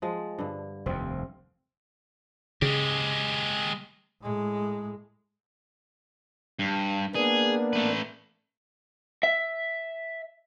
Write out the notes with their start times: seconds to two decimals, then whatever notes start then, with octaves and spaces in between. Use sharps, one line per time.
0.02 F3 G#3
0.39 G2 D3
0.86 F1 D#2 C4
2.62 C#3 G#3 G4
4.21 A2 G#3
6.59 G2
7.15 A#3 B3 D4 G#4
7.73 A3 B4
9.23 E5